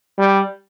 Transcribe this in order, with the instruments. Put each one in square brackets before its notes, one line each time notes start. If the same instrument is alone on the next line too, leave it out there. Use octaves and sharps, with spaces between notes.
[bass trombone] G3